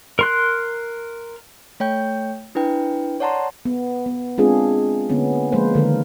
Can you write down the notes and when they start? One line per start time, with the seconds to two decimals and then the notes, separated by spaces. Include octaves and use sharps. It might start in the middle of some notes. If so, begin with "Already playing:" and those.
0.19 A#4 C6 F#6
1.80 A3 C#5 G5 G6
2.55 D4 E4 B4 G5
3.20 C#5 D5 F#5 A5 A#5 C6
3.65 B3
4.06 B3
4.38 G#3 C4 D4 F4 G#4
5.09 D3 A#3 B3 C#4
5.52 F3 G#3 A#3 B4 C5
5.75 D3 D#3 G#3 A3 D4 A#4